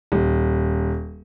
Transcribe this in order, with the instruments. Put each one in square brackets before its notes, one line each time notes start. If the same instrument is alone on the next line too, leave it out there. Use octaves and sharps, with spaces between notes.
[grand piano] D#1